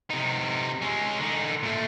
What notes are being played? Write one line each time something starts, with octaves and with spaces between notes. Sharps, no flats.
C3 D#4
G#3 C#4
D3 D#4
A#2 A3